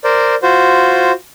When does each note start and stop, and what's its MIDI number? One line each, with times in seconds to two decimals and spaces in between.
0.04 0.35 70
0.04 0.35 72
0.04 0.35 74
0.43 1.12 65
0.43 1.12 66
0.43 1.12 72